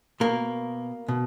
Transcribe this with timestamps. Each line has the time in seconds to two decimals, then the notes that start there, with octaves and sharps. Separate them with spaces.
0.20 B2 A#3 A#4
1.08 B2